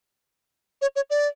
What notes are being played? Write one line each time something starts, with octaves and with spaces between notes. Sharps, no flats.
C#5
C#5
D5